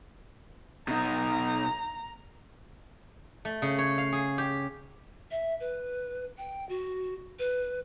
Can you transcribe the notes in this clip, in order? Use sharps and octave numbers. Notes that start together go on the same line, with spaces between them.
B2 D#4 A#5
A3
C#3
C#5
F5
G#4
G4
E5
B4
G5
F#4
B4